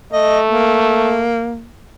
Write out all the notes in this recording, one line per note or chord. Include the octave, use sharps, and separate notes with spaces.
A3 D#5
A#3